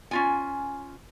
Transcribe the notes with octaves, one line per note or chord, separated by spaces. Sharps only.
C#4 F4 G#5